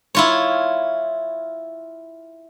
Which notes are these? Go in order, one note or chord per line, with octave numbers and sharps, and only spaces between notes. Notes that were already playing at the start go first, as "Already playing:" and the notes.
E4 F4 C#5